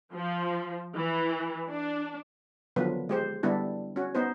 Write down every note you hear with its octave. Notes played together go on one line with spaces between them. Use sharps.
F3
E3
D4
D3 D#3 F3 F#3 B3 B4
G#3 G4 C5
D3 G3 B3 D4 E4
C#4 F#4
B3 D#4 C5